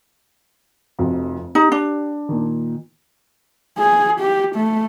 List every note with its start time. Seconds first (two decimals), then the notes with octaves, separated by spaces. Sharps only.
0.99 F1 F2 F#4
1.55 D#4 G4
1.72 D4
2.29 A#2 D#3
3.78 G#4
4.21 G4
4.56 A3